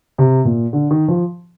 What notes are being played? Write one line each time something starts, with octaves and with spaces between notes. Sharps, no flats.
C3
A#2
D3
D#3
F3